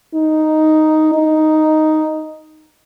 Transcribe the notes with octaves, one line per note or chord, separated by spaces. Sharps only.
D#4
D#4